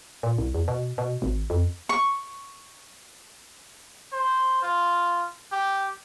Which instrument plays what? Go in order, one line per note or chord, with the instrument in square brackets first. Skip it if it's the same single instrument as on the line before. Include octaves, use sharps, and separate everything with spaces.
[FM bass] A#2
C2
E2
B2
B2
G#1
F2
[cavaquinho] C#6
[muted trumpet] C5
F4
G4